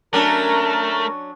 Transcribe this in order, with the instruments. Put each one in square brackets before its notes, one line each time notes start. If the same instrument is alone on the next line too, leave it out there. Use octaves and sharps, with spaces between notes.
[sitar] F#3 C#4 D4 [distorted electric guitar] A3 [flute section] A#4